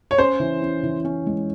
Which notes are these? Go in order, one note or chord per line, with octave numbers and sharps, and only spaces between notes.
C#5
C#4 C5
E3
C#4
E3
C#4
G#3